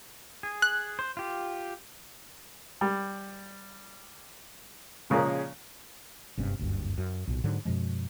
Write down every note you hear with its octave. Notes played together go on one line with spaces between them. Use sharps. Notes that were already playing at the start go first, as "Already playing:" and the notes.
G#4
F#6
C5
F4 G4
G3
A#2 C#3 F3 G#3 A#3 C#4
F#1 G2 C3 C#4
F#1 D2 G2
F#2
B1 A#2
G#2 D3 F#3
F#2 B2 F3 G#3